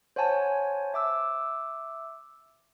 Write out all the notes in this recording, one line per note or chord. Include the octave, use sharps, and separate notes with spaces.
C5 C#5 F#5 G#5 A5
E5 D6 E6